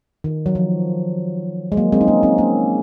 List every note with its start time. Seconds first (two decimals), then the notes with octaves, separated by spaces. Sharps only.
0.24 D#3
0.46 F#3
0.55 F3
1.72 G#3
1.77 F#3 A#3
1.92 G#3 C4
2.01 D#4
2.07 A#3 C#4
2.23 C4 D#4
2.38 A#3 C#4